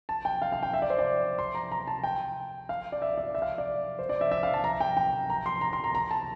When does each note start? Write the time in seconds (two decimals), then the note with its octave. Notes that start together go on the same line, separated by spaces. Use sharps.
0.09 A5
0.25 G5
0.42 F5
0.52 F5
0.63 G5
0.73 E5
0.82 D5
0.90 C5
0.99 D5
1.39 C6
1.55 A#5
1.72 A#5
1.87 A5
2.03 G5
2.69 F5
2.92 D5
3.02 E5
3.17 D5
3.35 E5
3.42 F5
3.58 D5
3.99 C5
4.09 D5
4.21 E5
4.31 E5
4.43 F5
4.54 A5
4.64 A#5
4.80 G5
4.97 G5
5.30 A#5
5.46 C6
5.61 A#5
5.73 C6
5.84 A#5
5.95 A#5
6.11 A5